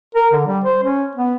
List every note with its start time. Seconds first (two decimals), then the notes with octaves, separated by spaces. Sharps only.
0.15 A#4
0.33 D3
0.47 G3
0.64 C5
0.83 C#4
1.15 B3